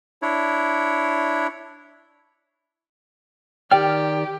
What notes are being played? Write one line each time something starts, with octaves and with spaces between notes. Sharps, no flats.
D4 E4 C#5
D#3 G4 D5 G5 F6